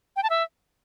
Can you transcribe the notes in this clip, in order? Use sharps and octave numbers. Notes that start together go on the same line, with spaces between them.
G5
A5
E5